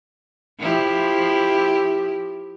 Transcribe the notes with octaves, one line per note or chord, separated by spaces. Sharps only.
F3 E4 G4